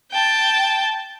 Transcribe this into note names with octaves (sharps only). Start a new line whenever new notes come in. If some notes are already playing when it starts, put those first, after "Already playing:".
G5 A5